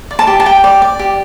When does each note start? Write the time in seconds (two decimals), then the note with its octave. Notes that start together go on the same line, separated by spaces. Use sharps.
0.11 D5
0.19 A5
0.27 G4
0.40 A5
0.45 G4 G5
0.64 D5
0.82 D5
0.99 G4